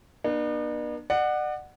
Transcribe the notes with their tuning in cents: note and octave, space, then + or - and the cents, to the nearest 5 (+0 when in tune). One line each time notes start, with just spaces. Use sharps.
B3 -40 D4 +45
D5 +40 F#5 +0